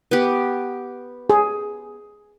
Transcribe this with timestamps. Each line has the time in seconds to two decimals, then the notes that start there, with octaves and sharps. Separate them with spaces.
0.11 B3 G4
1.30 G#4